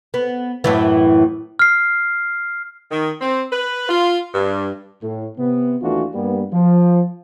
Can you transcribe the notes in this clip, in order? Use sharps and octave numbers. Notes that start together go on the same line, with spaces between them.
B3
F#2 A2 E3
F6 C7
D#3
C4
B4
F4
G2
A2
C3 B3
D#2 E3 A3 D4 F4 F#4
G2 G3 A#3 B3
F3